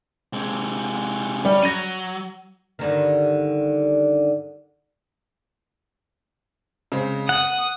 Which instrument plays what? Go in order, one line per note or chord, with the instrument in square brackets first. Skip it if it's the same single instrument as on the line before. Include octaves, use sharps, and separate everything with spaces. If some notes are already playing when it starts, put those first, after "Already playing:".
[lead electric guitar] C3 G#3
[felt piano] G3 [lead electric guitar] C#4
[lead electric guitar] F#3 [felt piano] A#6 D#7
[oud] G2 D3 D#3
[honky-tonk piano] C#3 G#3 C4
[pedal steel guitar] F#5 [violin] D#6 [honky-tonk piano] F#7